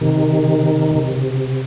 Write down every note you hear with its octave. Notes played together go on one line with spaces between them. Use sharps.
C3 D#3
C3